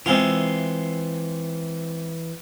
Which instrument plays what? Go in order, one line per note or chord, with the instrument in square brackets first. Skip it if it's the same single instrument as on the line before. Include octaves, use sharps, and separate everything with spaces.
[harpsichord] C3 G#3 F4 [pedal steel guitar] E3 E6